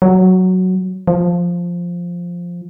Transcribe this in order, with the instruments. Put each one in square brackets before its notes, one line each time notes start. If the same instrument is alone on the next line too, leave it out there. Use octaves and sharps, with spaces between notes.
[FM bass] F#3
F3